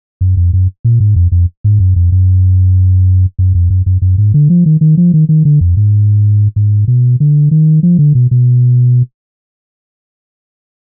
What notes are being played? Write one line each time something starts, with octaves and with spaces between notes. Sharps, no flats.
F#2
F2
F#2
A#2
G#2
F2
F2
G#2
F#2
F2
F#2
F#2
F2
F#2
F#2
F#2
G#2
D3
F3
D#3
D#3
F3
D#3
D#3
D3
F2
G#2
G#2
B2
D3
D#3
F3
D3
B2
B2